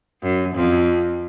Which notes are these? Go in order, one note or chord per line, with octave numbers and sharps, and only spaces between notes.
F#2
F2